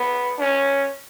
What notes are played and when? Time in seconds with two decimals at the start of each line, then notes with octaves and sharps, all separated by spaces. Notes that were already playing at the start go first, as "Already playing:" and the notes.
Already playing: B3
0.40 C#4